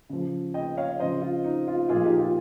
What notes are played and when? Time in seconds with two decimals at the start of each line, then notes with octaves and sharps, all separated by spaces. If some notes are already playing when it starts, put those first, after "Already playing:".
0.09 C#3 F3
0.54 D#5 G5
0.77 C#5 F5
1.00 C#3 F3 C5 D#5
1.22 F4
1.44 D#4
1.68 F4
1.89 A#2 F3 F4 G#4
2.04 D#4 G4
2.20 F4